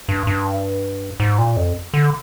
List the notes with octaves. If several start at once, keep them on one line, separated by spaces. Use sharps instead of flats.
G2
G2
G#2
A#2
F2
D3